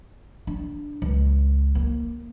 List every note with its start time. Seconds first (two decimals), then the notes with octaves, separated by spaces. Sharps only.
0.47 D4
1.02 C#2
1.75 A#3